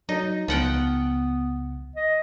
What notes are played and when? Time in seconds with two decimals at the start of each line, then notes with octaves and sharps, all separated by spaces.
0.09 F#3 D#4
0.48 C#2 F3 B3 F#5 G5
1.95 D#5